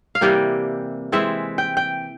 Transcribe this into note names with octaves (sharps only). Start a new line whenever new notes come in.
F5
C3 E3 G3 A#3 G5
E3 G#3 C4 E5
G5
G5